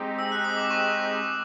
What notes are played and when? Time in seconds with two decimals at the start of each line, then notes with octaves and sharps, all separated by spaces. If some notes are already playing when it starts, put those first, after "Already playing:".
Already playing: G#3 C4 D#4 G4
0.18 E6
0.32 F#6
0.44 D#6
0.57 D6
0.71 C#6